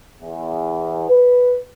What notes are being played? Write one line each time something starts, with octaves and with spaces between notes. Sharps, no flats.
E2
B4